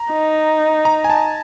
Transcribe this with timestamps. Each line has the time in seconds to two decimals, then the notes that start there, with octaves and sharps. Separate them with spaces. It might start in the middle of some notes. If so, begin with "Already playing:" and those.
Already playing: A#5
0.12 D#4
0.85 A#5
1.04 G#5
1.10 A5